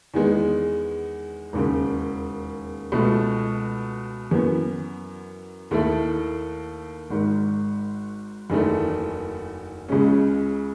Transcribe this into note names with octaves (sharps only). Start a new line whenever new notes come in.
E2 D#3 G#3 B3
E1 D#2 C#3
C#2 B2 A3
F#2 E3 B3
D#2 D#3 A3 E4 A4
G#1 G#2 D#3
F#1 E2 D#3 A3
C#2 C#3 G#3 C#4